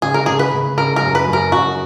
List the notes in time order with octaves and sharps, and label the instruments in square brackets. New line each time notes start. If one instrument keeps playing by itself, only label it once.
[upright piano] C#3 [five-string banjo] G#4
[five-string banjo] A#4
[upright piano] C#3 [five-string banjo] G#4
[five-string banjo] B4
[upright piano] C#3
[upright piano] C#3 [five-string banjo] A#4
[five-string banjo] A#4
[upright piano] F#2
[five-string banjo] B4
[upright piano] F#2
[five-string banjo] A#4
[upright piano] F#2 [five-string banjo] F#4